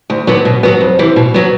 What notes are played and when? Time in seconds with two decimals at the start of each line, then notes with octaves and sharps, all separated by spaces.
0.10 D2
0.27 D3 F#3 B3
0.45 B2
0.63 F#3 B3
0.81 F2
0.99 C3 E3
1.16 B2
1.34 F#3 B3